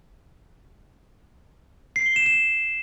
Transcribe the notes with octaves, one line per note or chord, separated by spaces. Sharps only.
C7
G7
E7
E7